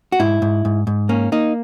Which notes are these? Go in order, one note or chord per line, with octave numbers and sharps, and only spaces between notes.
F#4
G#2 E4
G#2
G#2
G#2
A#3 C#4
A#3 D#4